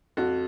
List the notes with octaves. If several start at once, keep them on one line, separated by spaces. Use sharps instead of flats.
F2 F#4